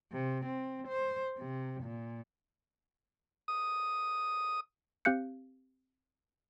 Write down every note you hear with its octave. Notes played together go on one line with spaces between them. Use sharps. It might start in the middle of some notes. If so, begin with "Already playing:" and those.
C3
C4
C5
C3
A#2
D#6
C4 G4 F5 F#6 G6 C#7